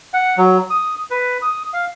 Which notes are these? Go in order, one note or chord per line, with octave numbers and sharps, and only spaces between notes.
F#5
F#3
D#6
B4
D#6
F5